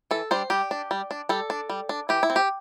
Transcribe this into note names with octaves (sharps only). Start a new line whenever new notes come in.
E3 A4
G3 D4 C5
G3 G4
D4
G3
D4
G3 A4
D4
G3
D4
E3 G4
E4
C4
G4